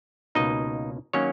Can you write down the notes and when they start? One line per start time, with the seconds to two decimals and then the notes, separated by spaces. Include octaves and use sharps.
0.35 C#2 B2 A#3 D#4 D#5
1.13 D#3 F#3 A#3 C#4 C#5